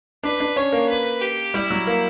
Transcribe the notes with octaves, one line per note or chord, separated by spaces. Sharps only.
D4 B4
D4
C#4 C#5
A#3
B4
G4
G3 E4
F#3
A#3